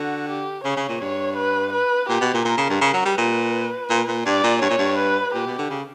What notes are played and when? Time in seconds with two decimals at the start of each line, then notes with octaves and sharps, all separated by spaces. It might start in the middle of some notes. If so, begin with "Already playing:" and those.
Already playing: D3 F#4
0.29 G4
0.64 C#3 C#5
0.77 C#3
0.89 A#2
1.01 G2 C#5
1.37 B4
1.73 B4
2.09 A#2 G4
2.21 B2
2.34 A#2
2.45 A#2 A#4
2.58 C#3
2.70 G2
2.81 C#3 A#4
2.93 F#3
3.05 G3
3.17 A#2 B4
3.90 A#2
4.08 A#2
4.25 G2 D5
4.44 A#2
4.62 G2 C#5
4.70 A#2
4.78 G2
4.98 B4
5.34 A#2 G4
5.46 B2
5.58 D3
5.70 C#3